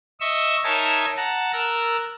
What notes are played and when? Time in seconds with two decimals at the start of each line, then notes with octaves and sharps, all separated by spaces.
0.20 D#5 E5 C#6 E6
0.64 D#4 A#4 C#5 E5 G#5 A5
1.17 F#5 A5 A#5
1.53 A#4 E6 F#6 A6